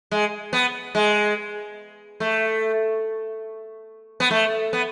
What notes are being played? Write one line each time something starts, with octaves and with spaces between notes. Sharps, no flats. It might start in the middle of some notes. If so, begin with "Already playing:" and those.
G#3
B3
G#3
A3
B3
A3
B3